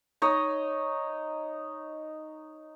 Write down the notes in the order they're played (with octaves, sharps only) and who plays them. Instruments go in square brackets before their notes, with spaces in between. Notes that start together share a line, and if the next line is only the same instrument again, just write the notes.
[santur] D#4 C#5 D#5